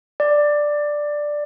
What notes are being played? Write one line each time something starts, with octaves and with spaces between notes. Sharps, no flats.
D5